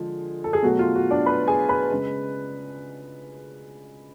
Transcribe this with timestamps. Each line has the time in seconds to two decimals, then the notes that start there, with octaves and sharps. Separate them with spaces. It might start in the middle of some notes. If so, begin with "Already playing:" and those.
Already playing: D3 F3 G#3 G#4
0.44 A4
0.53 G#4
0.63 B2 F#3 A3 F#4
0.79 F4
0.96 F#4
1.11 D4 D5
1.26 B4 B5
1.47 G#4 G#5
1.69 B4 B5
1.91 C#3 G#3